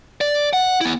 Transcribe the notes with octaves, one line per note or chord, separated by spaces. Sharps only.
D5
F#5
B3 E4